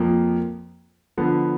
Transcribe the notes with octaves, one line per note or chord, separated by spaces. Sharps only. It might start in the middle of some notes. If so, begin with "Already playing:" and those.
Already playing: F2 F3 A#3
D3 F3 B3